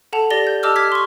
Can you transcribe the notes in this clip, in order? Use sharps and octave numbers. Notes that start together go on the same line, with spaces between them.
A4 F#5 A5 F7
G4 D5 A6 A#6 G7
G6
G4 D#5 A5 D6 E6 F6
D6 F6 G#6 B6
C6 C#6